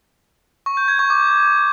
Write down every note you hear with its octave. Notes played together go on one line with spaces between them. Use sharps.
C#6
G6
G#6
C#6
D6